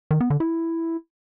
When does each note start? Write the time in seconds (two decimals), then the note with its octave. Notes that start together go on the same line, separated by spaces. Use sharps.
0.11 D#3
0.20 B3
0.30 D3
0.40 E4